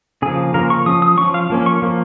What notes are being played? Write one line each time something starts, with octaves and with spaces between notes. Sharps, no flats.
C#3 F3 A#3 G#4
C#3 F3 A#3 A#4
C#6
F3 C#4 D#6
D#6
F3 C#4 C#6
F5
F3 A#3 C#4
C#6
F3 A#3